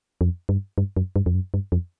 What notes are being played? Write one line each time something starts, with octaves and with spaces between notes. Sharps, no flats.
F2
G2
G2
F#2
G2
F2
F#2
G2
F2